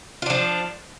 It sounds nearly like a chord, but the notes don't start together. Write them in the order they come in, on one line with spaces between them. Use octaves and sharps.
F4 D4 F3